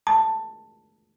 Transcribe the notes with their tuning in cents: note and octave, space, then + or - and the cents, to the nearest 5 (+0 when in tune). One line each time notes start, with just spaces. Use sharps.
A5 +10